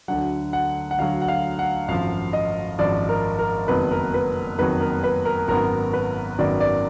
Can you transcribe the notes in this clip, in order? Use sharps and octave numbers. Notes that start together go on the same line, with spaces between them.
D2 D3 F#3 F#5
F#5
F#5
D2 D3 F#3 F5
F#5
F5
F#5
G#1 F#2 F3 F5
D#5
G#1 F#2 F3 D5
A#4
A#4
F#1 F2 D#3 F#3 B3 B4
A#4
B4
F#1 F2 D#3 F#3 B3 B4
A#4
B4
A#4
G#1 F#2 D#3 F#3 B3 A#4
B4
G#1 F#2 D#3 F#3 B3 D5
D5